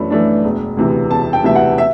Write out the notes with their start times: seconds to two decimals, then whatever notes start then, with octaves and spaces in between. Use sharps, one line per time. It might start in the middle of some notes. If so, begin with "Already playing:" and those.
Already playing: F#2 E3 A3 D4 B5
0.10 E3 A3 D4
0.44 E1
0.77 D2 C3 E3
1.11 E1 A5
1.33 G5
1.44 D2 C3 E3 E5
1.55 F#5
1.78 E5